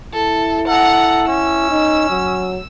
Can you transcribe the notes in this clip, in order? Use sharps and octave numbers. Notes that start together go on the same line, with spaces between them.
E4 A4
A4 F#5 A#5
C#4 E6
D#4
F#3